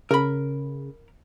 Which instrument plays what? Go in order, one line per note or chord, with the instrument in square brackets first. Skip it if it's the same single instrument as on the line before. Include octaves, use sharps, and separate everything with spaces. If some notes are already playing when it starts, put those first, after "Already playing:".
[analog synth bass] C#3 [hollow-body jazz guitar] A#4 B5